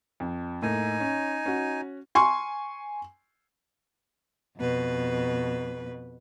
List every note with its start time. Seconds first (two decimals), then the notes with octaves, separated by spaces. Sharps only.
0.20 F2
0.63 A2 A#3 D#4 G#5
1.00 C#4
1.46 C#4 F#4
2.15 G#5 C6 C#6
4.57 F2 B2 B4